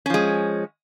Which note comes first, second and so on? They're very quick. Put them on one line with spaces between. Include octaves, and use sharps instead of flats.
C#4 F3 G#3